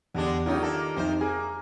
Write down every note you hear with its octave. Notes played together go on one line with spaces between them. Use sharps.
E2 D3 G#3 D4 G4
F#2 C#3 D#4 F4 G4 D5
D#3 A#3 A4
F2 C3 C4 D#4 C5
A#3 G#4